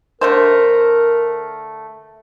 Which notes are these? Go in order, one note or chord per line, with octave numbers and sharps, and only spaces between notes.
D3 A3 A#4 C5